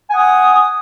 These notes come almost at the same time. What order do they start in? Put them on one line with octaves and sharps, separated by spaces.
G#5 F#5 D#6